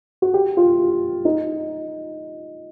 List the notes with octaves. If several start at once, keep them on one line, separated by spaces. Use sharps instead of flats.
F#4
G4
F4
D#4